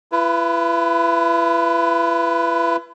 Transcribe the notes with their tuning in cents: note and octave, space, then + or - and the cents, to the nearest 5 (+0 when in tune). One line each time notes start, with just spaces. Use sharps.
E4 +40 B4 +0